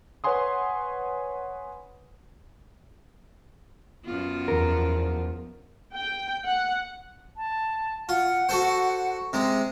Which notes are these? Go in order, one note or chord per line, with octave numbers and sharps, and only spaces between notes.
B4 C#5 F#5 G#5 C6 D#6
F#2 B3 F4
E2 F3 A#4
G5
F#5
A5
F4 F#5
F#4 A4 C5
C3 G#3